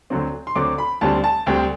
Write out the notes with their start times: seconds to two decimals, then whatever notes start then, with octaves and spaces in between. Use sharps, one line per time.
0.10 D2 D3 F#3 C4
0.47 C6
0.55 D2 D3 F#3 C4 D6
0.78 B5
1.01 D2 D3 G3 C4 A5
1.24 A5
1.46 D2 D3 G3 C4 G5